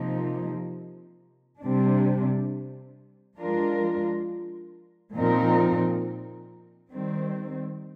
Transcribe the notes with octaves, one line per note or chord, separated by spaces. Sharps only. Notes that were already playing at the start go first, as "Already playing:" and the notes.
Already playing: C3 F3 A#3 D#4
C3 G3 D4
F3 G#3 D4 F4 A#4
A#2 F3 C4 D#4 A#4
D#3 G3 C4